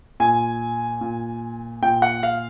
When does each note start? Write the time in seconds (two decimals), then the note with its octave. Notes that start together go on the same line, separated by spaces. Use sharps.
0.20 A#2 G#5
1.01 A#2
1.83 A#2 G5
2.02 F#5
2.23 F5